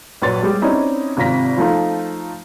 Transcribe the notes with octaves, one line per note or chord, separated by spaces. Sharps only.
A#1 F#3 B4 C#5 C6 A6
G3 G#3
C4 C#4 D#4 E4 D5 D#5
G#1 C3 F4 A#5 A#6 B6
F3 A3 D#4 F4